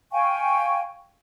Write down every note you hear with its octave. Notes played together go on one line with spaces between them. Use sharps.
F5 G5 G#5 C#6